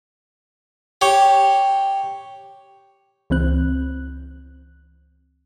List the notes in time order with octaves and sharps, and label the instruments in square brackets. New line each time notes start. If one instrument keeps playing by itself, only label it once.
[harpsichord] G4 C#5
[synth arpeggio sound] C#2 E3 C4 F#6